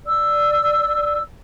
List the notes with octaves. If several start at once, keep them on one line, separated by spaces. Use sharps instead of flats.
D5 E6